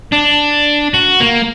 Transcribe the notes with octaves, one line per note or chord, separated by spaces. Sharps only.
D4
F#4
A#3